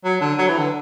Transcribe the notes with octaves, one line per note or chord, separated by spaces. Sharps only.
F#3
D3
F#3
E3
D3